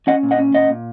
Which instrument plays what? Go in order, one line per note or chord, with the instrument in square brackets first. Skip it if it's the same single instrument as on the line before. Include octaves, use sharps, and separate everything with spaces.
[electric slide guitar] C#4 D#5 F#5
A#2
D#5 F#5
C#4
A#2 D#5 F#5
A#2